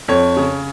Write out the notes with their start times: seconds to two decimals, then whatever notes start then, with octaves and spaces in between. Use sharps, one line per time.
0.08 F2 C#5
0.37 C#3